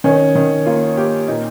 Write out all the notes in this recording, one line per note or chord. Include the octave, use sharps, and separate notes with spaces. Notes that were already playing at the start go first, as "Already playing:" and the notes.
D#3 C#4
D#3
A#3 F4
A#3 G4
A#2 D#4